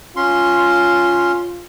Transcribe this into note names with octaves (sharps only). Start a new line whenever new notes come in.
C#4 F4 C6